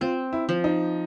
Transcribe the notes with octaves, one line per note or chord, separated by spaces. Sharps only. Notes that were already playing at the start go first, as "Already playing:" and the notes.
C4 F4
E4
F3
D#4